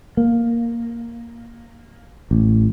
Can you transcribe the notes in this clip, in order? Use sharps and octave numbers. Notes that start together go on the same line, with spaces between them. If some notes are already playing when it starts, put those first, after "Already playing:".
A#3
A1